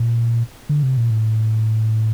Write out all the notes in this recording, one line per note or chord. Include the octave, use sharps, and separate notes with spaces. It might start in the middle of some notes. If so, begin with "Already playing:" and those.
Already playing: A#2
D3
C3
A#2
A2